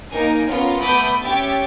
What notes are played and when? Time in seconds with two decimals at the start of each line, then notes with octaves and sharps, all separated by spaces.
0.13 A#3 D#4 A#4 G#5
0.48 B3 C#4 F4 A#4
0.80 A3 B3 B5 D6 D#6 G6
1.22 C#4 G4 E5 A6